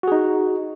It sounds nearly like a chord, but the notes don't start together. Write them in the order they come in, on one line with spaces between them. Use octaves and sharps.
F#4 G#4 D#4